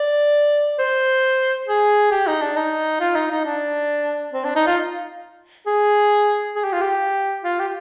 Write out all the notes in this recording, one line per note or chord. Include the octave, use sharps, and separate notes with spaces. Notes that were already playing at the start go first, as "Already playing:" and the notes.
Already playing: D5
C5
G#4
G4
D#4
D4
D#4
F4
D#4
D#4
D4
C4
D4
D#4
F4
G#4
G#4
G4
F4
G4
F4
G4